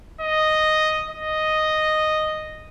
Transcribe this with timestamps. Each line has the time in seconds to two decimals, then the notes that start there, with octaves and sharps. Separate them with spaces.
0.21 D#5
1.10 D#5